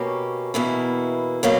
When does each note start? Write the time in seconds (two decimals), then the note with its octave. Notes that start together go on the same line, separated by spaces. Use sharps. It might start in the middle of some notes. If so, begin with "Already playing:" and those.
Already playing: B2 A#3 C#4 G4
0.54 E2 B2 A#3 E4
1.43 B2 F#3 A#3